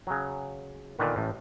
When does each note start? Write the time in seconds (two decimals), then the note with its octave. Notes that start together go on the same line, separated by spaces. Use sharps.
0.07 C#3 F#3
0.99 A#2 D3 D#3 B3
1.16 A1 A2